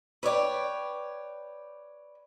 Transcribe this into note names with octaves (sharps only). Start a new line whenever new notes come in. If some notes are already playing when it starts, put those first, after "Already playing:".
B4 C#5 D5 G5